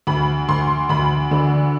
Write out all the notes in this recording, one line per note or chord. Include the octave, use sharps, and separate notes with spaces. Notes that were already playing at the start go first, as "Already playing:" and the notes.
D2 B5
D2 C6
D2 B5
D3